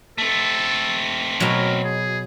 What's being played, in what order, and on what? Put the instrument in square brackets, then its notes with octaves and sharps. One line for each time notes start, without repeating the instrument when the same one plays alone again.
[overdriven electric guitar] A3 C4 [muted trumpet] A4
[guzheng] B2 F#3 [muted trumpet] A#4
[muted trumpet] G#4